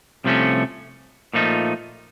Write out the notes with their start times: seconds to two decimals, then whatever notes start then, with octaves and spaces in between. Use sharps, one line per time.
0.24 C2 C3 F3 A3 C#4
1.34 A#2 F3 A3 D#4